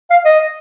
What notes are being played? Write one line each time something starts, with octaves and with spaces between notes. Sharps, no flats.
F5
D#5